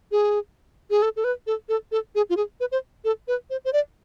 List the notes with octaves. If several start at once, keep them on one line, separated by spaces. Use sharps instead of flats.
G#4
G#4
A4
A4
B4
A4
A4
A4
G#4
F4
G#4
B4
C5
A4
B4
C5
C5
D5